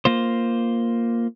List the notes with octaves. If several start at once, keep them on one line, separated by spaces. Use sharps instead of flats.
A#3 F4 C5